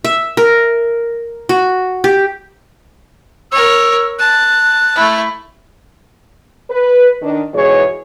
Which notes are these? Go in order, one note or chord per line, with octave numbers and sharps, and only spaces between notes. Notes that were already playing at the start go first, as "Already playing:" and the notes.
E5
A#4
F#4
G4
A#4 C#5 E6
A5 F#6
A3 E4
B4
D#3 D4
E2 G#2 B2 E3 G#4 C#5